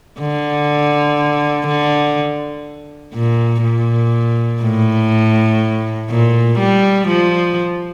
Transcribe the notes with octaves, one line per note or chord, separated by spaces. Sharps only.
D3
D3
A#2
A#2
A2
A#2
G3
F3